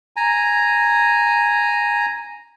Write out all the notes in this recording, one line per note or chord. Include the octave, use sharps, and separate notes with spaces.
G#5 A#5